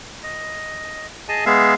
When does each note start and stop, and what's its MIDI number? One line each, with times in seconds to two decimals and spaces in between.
0.23 1.07 75
1.29 1.44 68
1.29 1.44 75
1.29 1.44 80
1.29 1.44 81
1.46 1.74 56
1.46 1.74 59
1.46 1.74 68
1.46 1.74 76
1.46 1.74 77